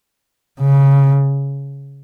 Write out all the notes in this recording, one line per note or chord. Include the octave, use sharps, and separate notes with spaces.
C#3